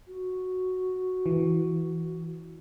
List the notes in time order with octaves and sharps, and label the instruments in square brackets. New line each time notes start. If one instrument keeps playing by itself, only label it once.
[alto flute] F#4
[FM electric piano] E3